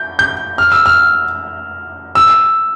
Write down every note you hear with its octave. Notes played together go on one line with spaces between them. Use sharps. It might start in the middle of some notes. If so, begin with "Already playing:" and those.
Already playing: G6
G6
F6
E6
F6
E6